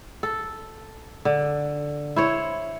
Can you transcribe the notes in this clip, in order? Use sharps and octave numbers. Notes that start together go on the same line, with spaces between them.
A4
D3
E4 C5 C#5